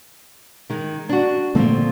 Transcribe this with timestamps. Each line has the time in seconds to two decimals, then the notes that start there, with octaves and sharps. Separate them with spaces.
0.70 D#3 G#3
1.09 D4 F#4
1.55 A#2 D3 F3 A3 C4 A4